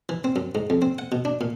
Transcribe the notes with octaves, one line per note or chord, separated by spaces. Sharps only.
E3
C4
F#2
G#2
F2
C4
F#5
B2
D4
A#2